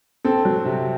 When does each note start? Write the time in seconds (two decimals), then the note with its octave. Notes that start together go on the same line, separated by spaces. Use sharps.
0.25 C4 A4
0.45 F#3
0.65 C3